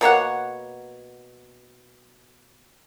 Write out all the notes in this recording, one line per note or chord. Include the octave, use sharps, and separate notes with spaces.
B2 A#3 C#5 F#5